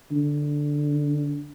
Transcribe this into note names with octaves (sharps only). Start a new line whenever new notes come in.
D3